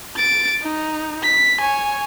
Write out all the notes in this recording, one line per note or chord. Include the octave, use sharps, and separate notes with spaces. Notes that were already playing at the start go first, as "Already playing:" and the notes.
A6 D7
D#4
B6
C#5 G#5